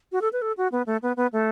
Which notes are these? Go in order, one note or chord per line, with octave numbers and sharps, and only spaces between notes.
F#4
A4
B4
A4
F#4
B3
A3
B3
B3
A3